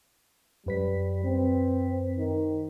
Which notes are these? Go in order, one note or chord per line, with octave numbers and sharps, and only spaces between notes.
F#2 G3 B4 B6
C4
D#3